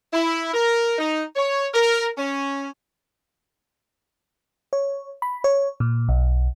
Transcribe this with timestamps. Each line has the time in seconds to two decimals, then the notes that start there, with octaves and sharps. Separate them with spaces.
0.13 E4
0.54 A#4
0.98 D#4
1.36 C#5
1.74 A#4
2.18 C#4
4.73 C#5
5.22 B5
5.44 C#5
5.80 A#2
6.09 B1